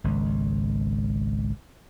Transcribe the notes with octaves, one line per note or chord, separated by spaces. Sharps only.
G#1 C#2